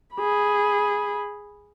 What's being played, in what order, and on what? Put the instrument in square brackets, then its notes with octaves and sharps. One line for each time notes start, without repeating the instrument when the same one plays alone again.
[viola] G#4 B5